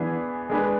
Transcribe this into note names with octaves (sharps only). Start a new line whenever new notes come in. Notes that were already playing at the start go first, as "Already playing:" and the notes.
Already playing: E3 B3 D4 G#4
G#3 D4 G#4 B4